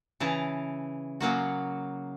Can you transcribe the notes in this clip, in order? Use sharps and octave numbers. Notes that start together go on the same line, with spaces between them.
C#3 E3 E4 A5 A#5
C#3 F#3 A#3 F#4